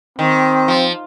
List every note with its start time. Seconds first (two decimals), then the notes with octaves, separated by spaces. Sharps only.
0.19 D#3 C4
0.68 F3